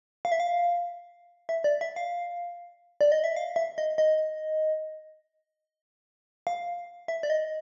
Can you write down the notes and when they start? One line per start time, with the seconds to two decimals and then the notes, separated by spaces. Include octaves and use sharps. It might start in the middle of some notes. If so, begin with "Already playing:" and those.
0.25 F5
0.32 E5
0.40 F5
1.49 E5
1.64 D5
1.81 E5
1.96 F5
3.01 D5
3.12 D#5
3.24 E5
3.36 F5
3.56 E5
3.78 D#5
3.98 D#5
6.47 F5
7.08 E5
7.23 D5
7.30 D#5